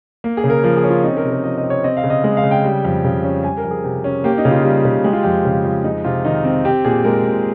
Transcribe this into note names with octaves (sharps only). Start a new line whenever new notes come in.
A#3
G#4
C#3
A#4
F3 A#4
G#4
C#4
F4
C4 D#4
A#4
C3
A#4
F3 D#5
D#5
C3
C#5
C4 D#5
F5
C#3
D#5
G#3
F5
C#3
G5
G3
F2
C#3
C#4
G3 G#5
A#4
F2
G#4
C3
C#4
A#3 G4
D#4
C#3
F4
G3
C#3
G#3 G4
F4
F2 G4
C#3
F2
G#3 D#4
C3 F4
D#3 D#4
C4
C4 G4
A#2 G#4
G#3 A#4
A#2